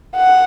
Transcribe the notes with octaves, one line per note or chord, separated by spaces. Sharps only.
F#5